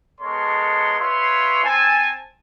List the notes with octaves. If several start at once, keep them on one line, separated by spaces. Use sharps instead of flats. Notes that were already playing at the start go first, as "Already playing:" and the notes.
G#3 B3 A4 A#4 C#5 C6
F4 B4 C#5 E5 C6
C4 G#5 A5